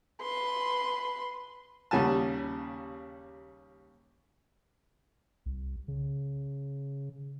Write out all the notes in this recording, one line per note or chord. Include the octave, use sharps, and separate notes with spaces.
B4 C6
D#2 C#3 G3 G#5 A5
C2
C#3